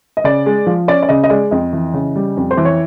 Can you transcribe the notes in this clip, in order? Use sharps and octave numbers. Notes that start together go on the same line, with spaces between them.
D#5
C#3 D5
G#3
F3
C#4 D5
D5
C#3 D#5
D#5
G#3 D5
F2 D#5
E3
C#3
G3
F2
C5
E3
C#5